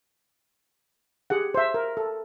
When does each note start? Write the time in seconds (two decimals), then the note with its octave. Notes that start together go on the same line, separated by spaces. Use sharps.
1.30 G4 G#4 F#5
1.54 C5 E5
1.74 A#4
1.97 A4